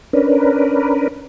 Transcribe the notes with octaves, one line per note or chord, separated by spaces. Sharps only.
C#4 D4 A#4 B4